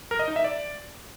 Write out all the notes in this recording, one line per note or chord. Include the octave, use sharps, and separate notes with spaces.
A#4
D#5
D#4
E5
D5